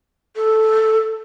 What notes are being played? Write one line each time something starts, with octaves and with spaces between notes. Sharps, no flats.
A4